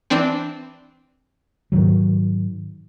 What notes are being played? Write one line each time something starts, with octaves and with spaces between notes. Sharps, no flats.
E3 C4 D4
G#2 D#3 F#3